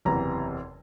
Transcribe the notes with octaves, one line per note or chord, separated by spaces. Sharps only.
F#1 E2 C3 E3 A#5